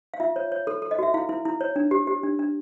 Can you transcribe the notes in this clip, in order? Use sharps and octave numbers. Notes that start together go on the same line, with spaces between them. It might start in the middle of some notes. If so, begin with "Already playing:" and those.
F5
F4 E5
C#5
C#5
A4
A4
D#5
F#4 E5
E4 F5
E4
E4
C#5
D4
G4
G4
D4
D4